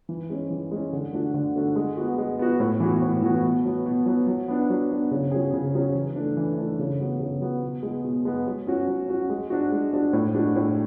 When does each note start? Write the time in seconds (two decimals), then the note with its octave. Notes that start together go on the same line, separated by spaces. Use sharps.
0.09 E3
0.30 G#3 C#4
0.50 E3
0.71 G#3 C#4
0.93 D3
1.13 A3 D4 F#4
1.34 D3
1.56 A3 D4 F#4
1.76 G#3
1.97 B3 F#4
2.18 G#3
2.39 B3 F#4
2.60 A2
2.80 E3 B3 F#4
3.01 A2
3.22 E3 B3 F#4
3.44 B2
3.65 F#3 B3
3.86 B2
4.06 F#3 B3
4.27 F#3
4.48 B3 D4
4.70 F#3
4.91 B3 D4
5.11 C#3
5.31 F#3 C#4 G#4
5.53 C#3
5.74 F#3 C#4 G#4
5.94 E3
6.16 A3 D4
6.37 E3
6.57 A3 D4
6.79 C#3
7.00 F#3 B3
7.20 C#3
7.41 F#3 B3
7.63 B2
7.83 G#3 B3
8.04 B2
8.25 G#3 B3
8.47 F#3
8.67 C#4 F#4
8.87 F#3
9.08 C#4 F#4
9.30 G#3
9.50 D4 F#4
9.72 G#3
9.93 D4 F#4
10.13 A2
10.34 G#3 D4 F#4
10.56 A2